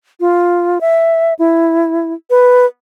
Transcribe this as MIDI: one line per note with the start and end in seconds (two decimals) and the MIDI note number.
0.20 0.79 65
0.81 1.34 76
1.39 2.13 64
2.30 2.66 71